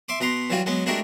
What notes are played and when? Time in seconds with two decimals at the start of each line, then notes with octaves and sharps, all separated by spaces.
0.09 E5 C6 D6
0.20 B2 B4 A#5 C6
0.50 E3 F#3 G3 F4 F#4
0.66 F#3 G#3 B3 C#4
0.86 G#3 A3 D4 F#4 G4 A#4